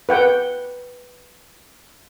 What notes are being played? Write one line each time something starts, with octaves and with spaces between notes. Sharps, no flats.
B4 F#5 G5